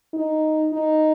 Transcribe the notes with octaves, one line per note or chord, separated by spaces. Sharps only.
D#4
D#4